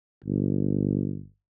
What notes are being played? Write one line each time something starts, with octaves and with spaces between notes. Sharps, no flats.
G1